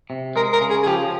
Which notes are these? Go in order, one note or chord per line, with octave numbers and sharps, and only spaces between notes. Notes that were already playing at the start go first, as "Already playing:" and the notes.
C3
G#3 A#4
A#4
C#3
G#4
G#4
F3 G4